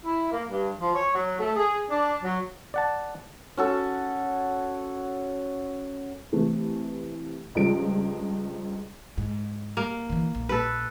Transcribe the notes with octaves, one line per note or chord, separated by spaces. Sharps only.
E4
A#3
G2
F3
C#5
F#3
A3
G#4
D4
F#3
D5 F#5 A5
C#4 F#4 A4
C3 E3 A3
C#2 G2 F3 D7
G#2
A#3
D3 E3
A#1
A4 B4